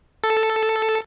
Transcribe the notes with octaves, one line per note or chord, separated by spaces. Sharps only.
A4